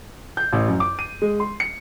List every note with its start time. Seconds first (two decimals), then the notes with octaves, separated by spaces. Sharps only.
0.37 G6
0.53 A1
0.68 F#2
0.80 D6
0.99 D#7
1.22 G#3
1.40 C6
1.60 C#7